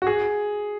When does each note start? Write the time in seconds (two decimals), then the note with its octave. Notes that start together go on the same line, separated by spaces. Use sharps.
0.02 F#4
0.07 G#4